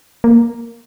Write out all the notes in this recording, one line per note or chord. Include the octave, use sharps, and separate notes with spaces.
A#3